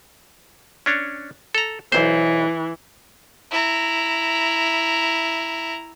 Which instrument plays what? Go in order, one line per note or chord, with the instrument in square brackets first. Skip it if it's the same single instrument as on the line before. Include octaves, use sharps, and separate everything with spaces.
[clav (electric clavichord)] C#4 D4 C#5
A4 A#5
[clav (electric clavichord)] B1 C5 [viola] E3
[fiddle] E4 A#5